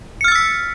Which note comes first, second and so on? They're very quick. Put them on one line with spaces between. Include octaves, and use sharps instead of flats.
C#7 F6 A6 E6 B6